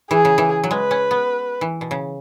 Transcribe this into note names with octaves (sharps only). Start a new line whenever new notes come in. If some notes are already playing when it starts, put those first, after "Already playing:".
E3 G#4
C#3
E3
F#3
G#3 B4
C#4
B3
E3
B2
C#3